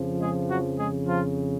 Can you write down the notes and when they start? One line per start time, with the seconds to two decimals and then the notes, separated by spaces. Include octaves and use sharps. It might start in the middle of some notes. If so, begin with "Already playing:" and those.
Already playing: F2 C#3 F3
0.20 G#3 G#4
0.49 F#3 F#4
0.78 G#3 G#4
1.06 F3 F4